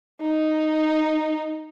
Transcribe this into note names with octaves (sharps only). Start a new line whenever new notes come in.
D#4